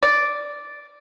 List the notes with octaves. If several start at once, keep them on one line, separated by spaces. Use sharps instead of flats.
D5